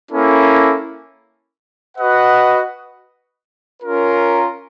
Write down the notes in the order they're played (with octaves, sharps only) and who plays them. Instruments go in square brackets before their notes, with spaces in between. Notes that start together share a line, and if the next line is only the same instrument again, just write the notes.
[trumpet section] A#3 C#4 E4 A4
F#4 B4 D#5 F#5
C#4 F4 A#4